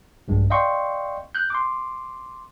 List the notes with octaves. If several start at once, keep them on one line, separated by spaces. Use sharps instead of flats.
A#1 G2 G#3
D5 D#5 F5 G5 C6 C#6
F#6 G6
C6 D6